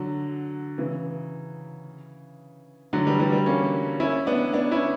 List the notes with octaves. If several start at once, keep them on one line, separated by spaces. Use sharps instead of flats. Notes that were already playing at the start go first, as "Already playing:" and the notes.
Already playing: D3 F#3
C#3 E3
D3 F#3
E3 G3
E3 G3
E3 G3
A#3 C#4
C#4 E4
B3 D4
B3 D4
C#4 E4